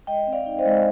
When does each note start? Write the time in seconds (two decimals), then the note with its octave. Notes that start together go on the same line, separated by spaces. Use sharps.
0.07 G#3 D#5 G5
0.27 C4
0.33 D5 F5
0.46 D#4
0.59 C5 D#5
0.65 G#3